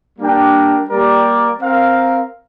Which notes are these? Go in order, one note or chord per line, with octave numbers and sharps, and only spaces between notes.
G3 A#3 D4 A#4 G5
G3 A#3 G4 A#4 D5
C4 A#4 F5